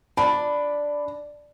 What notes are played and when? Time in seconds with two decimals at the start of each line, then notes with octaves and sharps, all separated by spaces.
0.17 D4 B5